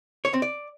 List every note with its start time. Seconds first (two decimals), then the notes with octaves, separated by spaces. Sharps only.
0.25 C#5
0.33 C4
0.42 D5